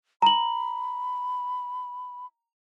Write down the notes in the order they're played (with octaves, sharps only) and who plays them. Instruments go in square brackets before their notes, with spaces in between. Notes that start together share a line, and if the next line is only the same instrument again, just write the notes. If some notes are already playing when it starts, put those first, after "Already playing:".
[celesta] A#5 F#7 [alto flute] B5